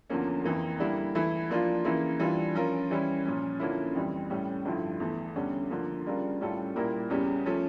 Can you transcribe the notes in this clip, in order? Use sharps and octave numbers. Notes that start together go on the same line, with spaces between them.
E2 D3 F3 A#3 C#4
F2 E3 A#3
D3 G3 A#3 E4
E3 A3 E4
F3 A#3 D4 F4
C#3 E3 A#3 E4
E3 G3 D4 F4
F3 C#4 F4 A#4
E3 G3 C#4 E4
A#2 F3 C#4
D3 F3 A#3 C#4 E4
F2 E3 G3
A2 G3 C#4
G2 D3 F3 A3 E4
E2 E3 A3
E2 D3 G3 C#4
D3 F3 A#3
C#3 G3 D4 F4 A#4
A2 G3 C#4 F4 A4
A#2 G3 A#3 E4 A#4
E2 C#3 G3 C#4 G4
F3 A3 C#4